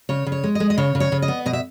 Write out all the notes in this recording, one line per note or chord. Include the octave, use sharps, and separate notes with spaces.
C#3 C#5
C#3
C#5
G#3
G#3 D#5
D#5
C#3 C#5
C#3
C#5
C#3
D#5
B3
B2 D#5
E5